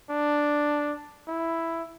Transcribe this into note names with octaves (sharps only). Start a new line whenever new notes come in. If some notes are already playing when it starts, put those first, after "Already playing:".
D4
E4